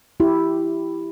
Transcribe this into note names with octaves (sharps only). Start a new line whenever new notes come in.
E4 G4